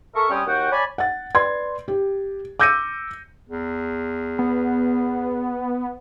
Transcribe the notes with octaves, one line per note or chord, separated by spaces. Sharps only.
A4 A#4 E5 C#6
G3 C4 C#4 G5 D#6
D#2 F#4 F#5 G5
C#5 D5 G#5 A5 B5
F#5 A6
B4 D5 C6 G#6
G4
D6 E6 G6 A#6 C#7 D#7
E2
B3